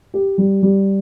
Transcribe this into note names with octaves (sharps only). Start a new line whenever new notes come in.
G4
G3
G3